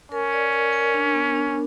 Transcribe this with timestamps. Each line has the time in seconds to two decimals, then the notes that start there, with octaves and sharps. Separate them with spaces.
0.12 C#4 A#4
0.32 D5
0.52 A#4
0.73 A#4
0.94 D4
1.15 B3
1.35 D4